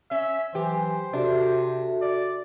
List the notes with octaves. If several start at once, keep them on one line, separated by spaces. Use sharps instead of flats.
C#4 E5
E3 F#3 G4 C5 G#5
C3 D4 F#4 A4 E5
D5